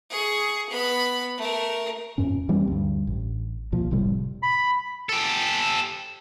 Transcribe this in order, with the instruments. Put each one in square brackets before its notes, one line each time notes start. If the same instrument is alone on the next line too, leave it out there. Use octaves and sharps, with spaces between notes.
[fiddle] G#4 C#6
B3 B5
A3 A#4
[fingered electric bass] F2 G#2 C#4
E3 G3 C4 C#4
D2 G2
A1
C2 A#2 F3
F1 A2 C3 G3
[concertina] B5
[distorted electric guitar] G4 A4